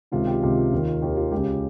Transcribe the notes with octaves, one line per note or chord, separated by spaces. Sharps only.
C#2 C3 D#3 F4
G4
C#2 C3 D#3 F4
D#2 D#3
D#2 D#3 G4
F4
C#2 C#3 G4